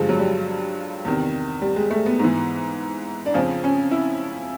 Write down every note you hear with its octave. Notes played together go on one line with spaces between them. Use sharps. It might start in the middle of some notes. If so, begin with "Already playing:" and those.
Already playing: G2 D3 F3 G#3
F#3
G3
E2 C3 D#3
G3
G#3
A3
B3
G#2 E3
D4
F2 C#3 F3 C#4
C#4
E4